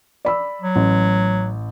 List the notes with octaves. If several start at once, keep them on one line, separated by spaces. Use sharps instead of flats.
D5 B5 E6
F#3
A1